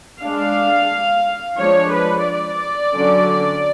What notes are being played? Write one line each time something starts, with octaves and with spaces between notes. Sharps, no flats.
G#3 D4 F5
F3 G#3 D4 C#5
B4
D5
D3 F#3 C#4